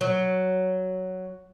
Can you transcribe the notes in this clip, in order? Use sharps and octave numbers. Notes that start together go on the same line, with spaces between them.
F#3